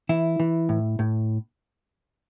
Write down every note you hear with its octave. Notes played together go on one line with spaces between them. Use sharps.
E3 E4
E3
A2
A2